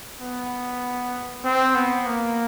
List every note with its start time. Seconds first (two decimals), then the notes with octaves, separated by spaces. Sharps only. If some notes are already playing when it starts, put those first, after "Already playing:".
0.19 B3
1.44 C4
1.75 B3
2.06 A#3